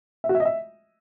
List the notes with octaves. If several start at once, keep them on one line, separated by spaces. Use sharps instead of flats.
E5
F#4
E5
D#5
E5